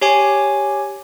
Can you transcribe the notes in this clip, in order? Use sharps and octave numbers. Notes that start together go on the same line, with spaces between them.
G4 C#5 G#5 D6